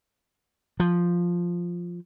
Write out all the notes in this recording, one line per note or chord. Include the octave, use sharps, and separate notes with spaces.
F3